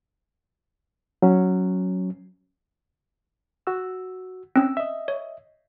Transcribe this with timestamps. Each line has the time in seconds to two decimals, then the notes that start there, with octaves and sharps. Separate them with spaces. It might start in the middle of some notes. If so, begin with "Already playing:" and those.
1.22 F#3 C#4
3.67 F#4 E6
4.56 C4 C#4 E6
4.77 D#5 E5
5.08 C#5